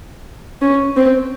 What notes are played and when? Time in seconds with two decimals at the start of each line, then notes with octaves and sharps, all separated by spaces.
0.62 C#4
0.97 C4